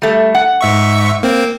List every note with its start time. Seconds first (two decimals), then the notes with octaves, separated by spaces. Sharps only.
0.02 G3 A3
0.35 F#5
0.61 G#2 E5 C#6
1.23 A#3 C4